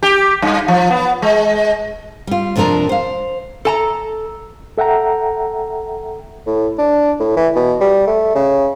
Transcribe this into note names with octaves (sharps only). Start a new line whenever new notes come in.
G4
G2
F3
B3
G#3
G3 F4
F2 C3 F3 D4 A#4
C5 F5
A4 A5 A#5
A4 E5 F#5 G5 A#5
A2
D4
A2
E3
B2
G3
A3
C#3